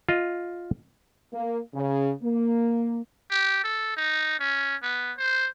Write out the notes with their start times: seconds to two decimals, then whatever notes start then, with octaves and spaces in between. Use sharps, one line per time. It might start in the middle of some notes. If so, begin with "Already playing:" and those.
0.09 F4 D#5
1.33 A#3
1.74 C#3
2.23 A#3
3.30 G4
3.64 A4
3.97 D#4
4.40 C#4
4.82 B3
5.18 C5